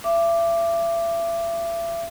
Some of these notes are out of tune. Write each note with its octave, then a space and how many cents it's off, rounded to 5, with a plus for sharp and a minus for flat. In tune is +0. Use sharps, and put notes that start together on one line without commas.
E5 +35 D6 +0